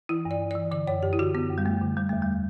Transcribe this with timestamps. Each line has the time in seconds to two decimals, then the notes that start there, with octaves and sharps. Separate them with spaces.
0.09 E3 E4
0.25 G2
0.31 D5
0.41 G2
0.51 D5
0.56 E3
0.71 D3 D5
0.87 F#2 C#5
1.03 F#2 G4
1.13 E4
1.19 D3 F#4
1.34 D3 B3
1.50 F#2
1.58 G3
1.65 F#2 A3
1.81 D3
1.97 D3 G3
2.09 E2 A3
2.22 G3